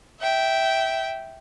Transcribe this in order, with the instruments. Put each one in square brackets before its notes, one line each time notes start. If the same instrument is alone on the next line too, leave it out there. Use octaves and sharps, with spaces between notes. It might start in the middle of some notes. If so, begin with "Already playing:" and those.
[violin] E5 G5